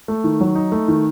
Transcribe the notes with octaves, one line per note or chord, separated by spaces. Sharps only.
A3
D#3
F#3
D#4
A3
D#3